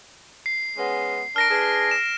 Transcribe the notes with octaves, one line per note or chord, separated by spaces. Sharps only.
C7
G#3 B3 C#4
D4 A#4 F6 A#6 D7
D4 G#4 B4
E7